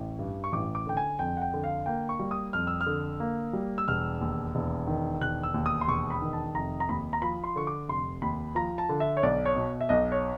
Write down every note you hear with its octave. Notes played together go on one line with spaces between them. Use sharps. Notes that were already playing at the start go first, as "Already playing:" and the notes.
Already playing: A1
G2
C#6
A1 D6
D6
D3 G5
G#5
F2 G5
F#5
G5
D3
F5
A#3 G5
C#6
G3
D#6
F2 F6
E6
F6
D3
A#3
G3
E6
E1 F6
D#2
E1
D#3
E1 F#6
E6
D#2
D#6
C6
E1 C#6
B5
D#3
A5
F1 A#5
A#5
D#2 B5
A#5
F3 B5
C6
D3 C#6
D6
F1 C6
D#2 B5
F3 A#5
A5
D3
E5
C#5
B1 D5
C#5
B2
E5
B1 D#5
C#5